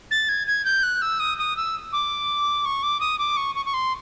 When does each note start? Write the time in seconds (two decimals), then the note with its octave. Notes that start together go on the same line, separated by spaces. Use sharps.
0.11 A6
0.29 G#6
0.47 G#6
0.65 G6
0.83 F#6
1.02 E6
1.20 D#6
1.38 D#6
1.57 E6
1.93 D6
2.65 C#6
2.83 D6
3.00 D#6
3.18 D6
3.37 C#6
3.55 C#6
3.65 C#6
3.74 C6